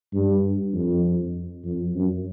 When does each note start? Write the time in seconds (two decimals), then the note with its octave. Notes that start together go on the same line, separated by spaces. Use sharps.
0.13 G2
0.73 F2
1.64 F2
1.95 F#2